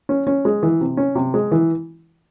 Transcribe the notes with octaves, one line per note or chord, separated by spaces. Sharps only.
C#4
C#4
G#3
E3
C3
C#4
C3
G#3
E3